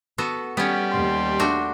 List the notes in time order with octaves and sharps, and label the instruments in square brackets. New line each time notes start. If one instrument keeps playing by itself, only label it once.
[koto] B3 F#4 A4
[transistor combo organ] G3 [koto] B3 C#4
[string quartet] D#2 C6
[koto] A3 D4 F#4